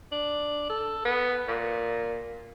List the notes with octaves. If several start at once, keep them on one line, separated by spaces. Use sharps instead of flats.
D4
A4
B3
A#2